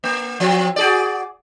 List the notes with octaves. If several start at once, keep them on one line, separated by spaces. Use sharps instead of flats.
A#3
F3 C4
F#4 G#4 D5